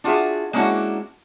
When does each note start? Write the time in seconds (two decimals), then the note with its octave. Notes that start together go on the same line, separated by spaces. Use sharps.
0.04 D4 F4 F#4 G#4 E5
0.53 G#3 A#3 C#4 D4 E4 F#4